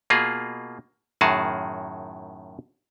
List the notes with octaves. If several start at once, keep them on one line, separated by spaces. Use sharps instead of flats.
B2 A#3 F4 G#4
F#2 A2 D#3 F#4 G#4 A5